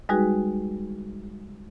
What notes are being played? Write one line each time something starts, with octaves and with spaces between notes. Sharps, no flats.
G3 G#3 D#4 F#4 G#4 B4